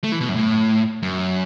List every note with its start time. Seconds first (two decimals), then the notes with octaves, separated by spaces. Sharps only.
0.04 A3
0.12 E3
0.21 B2
0.29 F#2
0.36 A2
1.03 F#2